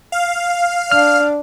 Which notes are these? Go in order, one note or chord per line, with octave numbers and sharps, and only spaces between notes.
F5
D4 F6